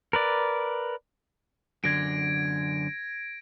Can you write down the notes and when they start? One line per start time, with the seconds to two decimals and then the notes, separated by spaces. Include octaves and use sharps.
0.13 A#4 B4 D5
1.84 F#2 D3 G#6 A#6 D7